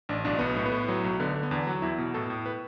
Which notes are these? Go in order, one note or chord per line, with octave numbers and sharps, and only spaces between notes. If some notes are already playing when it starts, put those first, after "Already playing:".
A1 D4
B1 D4
B1 B3
A2
B3
A2
F#3
B1
D3 B3
D3
B3
E2 D4
F#3
E2 E4
B2
A2 A4
A2
B4